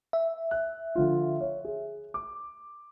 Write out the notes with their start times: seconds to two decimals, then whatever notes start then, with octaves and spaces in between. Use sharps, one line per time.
0.13 E5
0.51 F#6
0.95 D3 F3 F4
1.41 C#5
1.65 G#4
2.14 D6